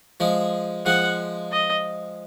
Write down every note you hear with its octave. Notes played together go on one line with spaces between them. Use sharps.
F3 G#3
F3 G#3 F#5
D#5